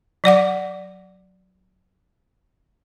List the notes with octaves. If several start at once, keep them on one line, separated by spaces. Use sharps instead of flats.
F#3 D5 F#5 D6